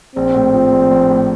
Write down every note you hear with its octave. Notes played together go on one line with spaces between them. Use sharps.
A#1 C4
A2
F3
A#1
A#1
A2